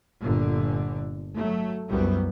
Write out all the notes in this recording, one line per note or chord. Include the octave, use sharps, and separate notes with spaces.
G1 A#2 D3
F#3 A3
C2 F#2 G3 B3